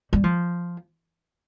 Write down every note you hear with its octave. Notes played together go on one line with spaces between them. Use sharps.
G3
F3